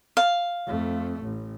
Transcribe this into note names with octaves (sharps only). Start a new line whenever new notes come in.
F5
F2 A3
A1